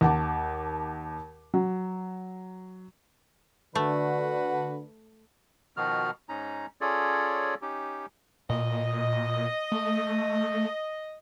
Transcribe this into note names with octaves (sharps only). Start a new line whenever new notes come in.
D#2 F#5 A5 D6
F#3
D3 A3 F#4 B4
B2 D#3 F3 F#4 F6
G#2 C#4 D#4 A#5
C#4 F4 G#4 A4 C#5 D5
C#4 D#4 G4
A#2 D#5
A3